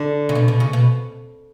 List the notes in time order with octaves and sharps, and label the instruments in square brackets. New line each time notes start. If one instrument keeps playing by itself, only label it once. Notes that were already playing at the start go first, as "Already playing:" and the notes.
Already playing: [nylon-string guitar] D3
[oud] C#3
B2
B2
C#3
B2